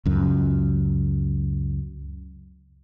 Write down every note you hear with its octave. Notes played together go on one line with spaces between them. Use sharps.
C#2 F#2